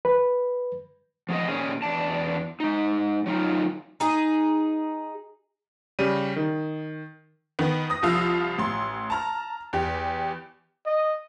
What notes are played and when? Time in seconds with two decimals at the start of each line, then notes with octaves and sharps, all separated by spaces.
0.05 B4
1.29 F3 B3 G#4 D#5
1.48 A#2 C#4 G#4
1.82 E2 D4 A5
2.60 G#3 D#4
3.26 F#3 D#4 F4
4.00 D#4 G#4
5.99 C#3 G3 D#7
6.36 D#3
7.59 D#3 B3
7.90 D#6 A#6
8.03 C2 F3 F4 F5 E6
8.58 A1 C6
9.10 A5 A#5 F6
9.73 E2 G4
10.86 D#5